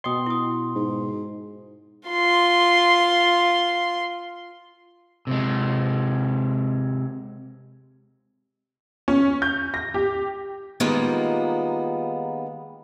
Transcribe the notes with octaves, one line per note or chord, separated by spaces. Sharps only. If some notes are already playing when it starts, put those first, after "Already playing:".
B2 D#5 G5 C6 D#6
E4 D#6
G#2
F4 C6
C3 G#3
C#4
G6
A#6
G4
D#3 G3 G#3 A#3 B3 F4